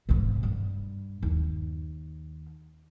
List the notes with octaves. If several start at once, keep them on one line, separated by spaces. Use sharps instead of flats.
G#2 C#3
G2
D#2